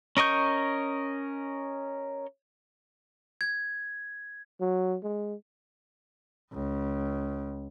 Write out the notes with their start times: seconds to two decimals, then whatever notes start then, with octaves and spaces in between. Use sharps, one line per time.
0.17 C#4 A#4 D#5 C#6 G6
3.41 G#6
4.60 F#3
5.03 G#3
6.53 C#2